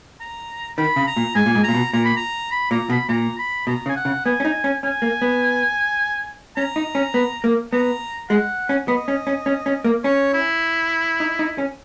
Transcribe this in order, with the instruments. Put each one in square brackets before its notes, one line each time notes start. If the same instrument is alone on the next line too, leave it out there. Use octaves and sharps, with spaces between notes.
[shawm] A#5
[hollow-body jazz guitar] D#3 [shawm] B5
[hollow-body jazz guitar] C#3
[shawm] A#5
[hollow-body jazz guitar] A#2
[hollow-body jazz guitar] G#2 [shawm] G#5
[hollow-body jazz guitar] A#2
G#2
[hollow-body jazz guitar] A#2 [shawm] A#5
[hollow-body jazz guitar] B2
[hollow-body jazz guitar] A#2 [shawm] A#5
[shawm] B5
A#5
B5
[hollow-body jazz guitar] A#2 [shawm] A#5
[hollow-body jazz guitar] B2 [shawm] B5
[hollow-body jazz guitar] A#2 [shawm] A#5
[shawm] B5
[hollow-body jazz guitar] B2 [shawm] A#5
[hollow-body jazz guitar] C#3
[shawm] G#5
F#5
[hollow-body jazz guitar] C#3
[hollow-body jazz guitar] B3 [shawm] G#5
[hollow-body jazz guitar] C#4
D#4
C#4
[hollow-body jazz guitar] C#4 [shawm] G#5
[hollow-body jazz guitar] A#3
B3
[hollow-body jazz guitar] C#4 [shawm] A#5
[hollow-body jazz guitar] D#4
C#4
B3
A#3
[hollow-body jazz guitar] B3 [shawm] A#5
[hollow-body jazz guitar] G#3 [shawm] F#5
[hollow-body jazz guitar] C#4
[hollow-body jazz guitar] B3 [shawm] D#5
[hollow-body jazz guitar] C#4
C#4
C#4
C#4
A#3
[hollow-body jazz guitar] C#4 [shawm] C#5
[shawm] E4
[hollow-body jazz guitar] D#4
D#4
C#4